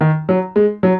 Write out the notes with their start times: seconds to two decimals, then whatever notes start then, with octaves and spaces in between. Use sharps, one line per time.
0.01 D#3
0.29 F#3
0.56 G#3
0.83 F#3